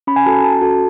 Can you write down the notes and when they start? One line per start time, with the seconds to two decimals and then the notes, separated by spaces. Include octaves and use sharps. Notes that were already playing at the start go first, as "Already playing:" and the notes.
0.07 C#4 B5
0.16 G#5
0.25 F#4 A4 A5
0.35 A#5
0.44 C#4 A5
0.61 F#4 A4